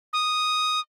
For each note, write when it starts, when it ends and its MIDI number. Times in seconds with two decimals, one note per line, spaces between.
0.13 0.80 87